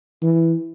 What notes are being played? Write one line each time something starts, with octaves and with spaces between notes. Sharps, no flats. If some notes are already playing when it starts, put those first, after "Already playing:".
E3